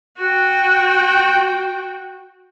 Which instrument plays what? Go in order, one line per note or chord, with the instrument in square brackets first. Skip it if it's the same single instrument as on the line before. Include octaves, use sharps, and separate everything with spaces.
[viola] F#4 G5